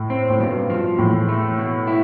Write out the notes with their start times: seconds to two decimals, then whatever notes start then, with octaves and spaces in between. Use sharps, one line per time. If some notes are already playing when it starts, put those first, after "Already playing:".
Already playing: A2
0.10 C4
0.30 A2
0.40 G2 B2
0.70 F3
0.98 E2 A2
1.29 A3
1.58 B2
1.87 E4